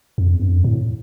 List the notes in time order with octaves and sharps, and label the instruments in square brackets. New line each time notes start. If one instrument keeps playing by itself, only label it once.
[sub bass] F2
E2
G2
F2
A2